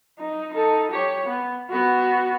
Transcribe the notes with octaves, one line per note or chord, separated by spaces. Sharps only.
D#4
D#4 A4
G4 C#5
B3
B3 F#4